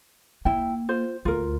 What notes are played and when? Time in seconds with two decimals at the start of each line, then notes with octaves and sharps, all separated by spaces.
0.45 A#3 E4 G5
0.89 F4 C5
1.25 D2 F4 A#4